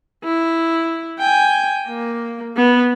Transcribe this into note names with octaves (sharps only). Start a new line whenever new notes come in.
E4
G5 G#5
A#3
B3